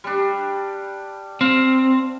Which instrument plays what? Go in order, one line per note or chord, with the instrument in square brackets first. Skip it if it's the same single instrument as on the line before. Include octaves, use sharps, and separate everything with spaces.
[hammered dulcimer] G3 D4
[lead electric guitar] C4 [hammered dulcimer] F5